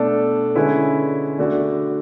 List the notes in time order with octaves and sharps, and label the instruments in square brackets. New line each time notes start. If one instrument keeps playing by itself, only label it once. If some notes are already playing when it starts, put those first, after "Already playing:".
Already playing: [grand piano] B2 A3 D4 A4
D3 G#3 C#4 E4 B4
D3 A3 D4 F#4